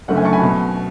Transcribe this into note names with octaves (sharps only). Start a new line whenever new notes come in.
F#1 F#2 D3 A3 F#5
E5 G#5
A5 C#6
G#5 B5
B2